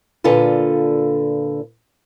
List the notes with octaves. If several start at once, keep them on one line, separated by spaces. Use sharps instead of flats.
A#2 D3 F4 A4 B4